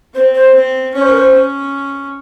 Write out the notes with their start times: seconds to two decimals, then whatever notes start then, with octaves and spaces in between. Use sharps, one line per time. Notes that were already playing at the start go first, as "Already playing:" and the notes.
0.15 C4 C5
0.35 C5
0.54 C4
0.95 C#4 C#5
1.02 C5
1.10 A#4
1.17 C5
1.35 C#4